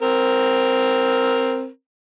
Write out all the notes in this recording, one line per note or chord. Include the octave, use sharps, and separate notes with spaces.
C4 A#4